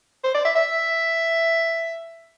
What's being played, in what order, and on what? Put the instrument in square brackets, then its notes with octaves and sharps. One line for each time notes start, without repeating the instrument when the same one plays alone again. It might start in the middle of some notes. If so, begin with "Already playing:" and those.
[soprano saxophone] C5
D5
E5
E5